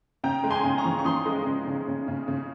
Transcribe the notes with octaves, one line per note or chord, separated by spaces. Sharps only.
C#3 G5 A#5
G#3
G#5 C6
C#3
A#5 C#6
F3
C#6
F3 C6 D#6
G#3
C#3
C#3
C#3
C#3
C#3